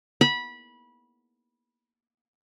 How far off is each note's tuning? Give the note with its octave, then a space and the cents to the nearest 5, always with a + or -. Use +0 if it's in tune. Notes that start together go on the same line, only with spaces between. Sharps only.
B5 -20